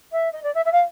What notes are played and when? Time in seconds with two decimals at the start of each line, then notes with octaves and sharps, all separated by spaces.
0.12 E5
0.32 D#5
0.43 D5
0.54 E5
0.65 E5
0.72 F5